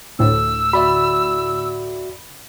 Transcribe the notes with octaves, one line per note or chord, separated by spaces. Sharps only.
D2 A2 E6
F#4 D5 E5 B5